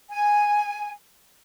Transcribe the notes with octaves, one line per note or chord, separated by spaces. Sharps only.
G#5